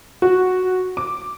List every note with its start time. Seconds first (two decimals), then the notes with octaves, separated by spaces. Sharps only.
0.22 F#4
0.97 D6